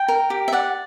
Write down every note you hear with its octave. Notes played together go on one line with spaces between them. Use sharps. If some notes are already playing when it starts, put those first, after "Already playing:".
Already playing: G5
A#4
G4
E5
D5 F#5